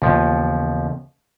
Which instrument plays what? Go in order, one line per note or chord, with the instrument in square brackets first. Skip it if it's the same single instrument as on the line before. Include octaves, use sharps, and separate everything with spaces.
[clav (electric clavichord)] D#2 F3 [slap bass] C#3 E3 B3